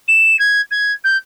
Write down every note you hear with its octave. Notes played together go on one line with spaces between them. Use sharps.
E7
G#6
G#6
G6